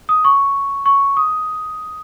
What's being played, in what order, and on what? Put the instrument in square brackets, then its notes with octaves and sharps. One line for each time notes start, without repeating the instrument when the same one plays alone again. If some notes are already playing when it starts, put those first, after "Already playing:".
[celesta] D#6
C#6
C#6
D#6